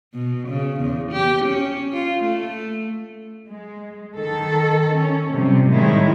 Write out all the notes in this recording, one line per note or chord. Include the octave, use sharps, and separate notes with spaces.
B2
C#3
E2
G4
C#4
F4
A3
G#3
D#3 A4
C#4
C3 F3 G3
A2 D#3 G3 G#3 E4